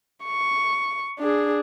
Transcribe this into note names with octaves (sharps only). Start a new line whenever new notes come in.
C#6
D4 G#4